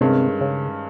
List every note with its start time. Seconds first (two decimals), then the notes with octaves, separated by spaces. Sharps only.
0.01 G2 C3 D#3 G#3 C#4
0.41 C#3